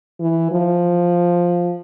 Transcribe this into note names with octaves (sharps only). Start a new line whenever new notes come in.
E3
F3